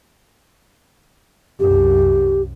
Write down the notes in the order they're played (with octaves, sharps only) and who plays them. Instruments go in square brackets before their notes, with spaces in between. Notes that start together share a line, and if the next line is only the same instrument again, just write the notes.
[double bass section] C2 F#2 [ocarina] G4